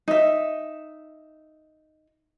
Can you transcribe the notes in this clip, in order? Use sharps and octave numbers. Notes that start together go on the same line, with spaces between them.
D#4 E5